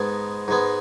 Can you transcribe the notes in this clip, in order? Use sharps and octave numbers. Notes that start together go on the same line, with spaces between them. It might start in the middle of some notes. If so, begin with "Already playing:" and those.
Already playing: G#2 G#3 B3 A5
G#2 G#3 B3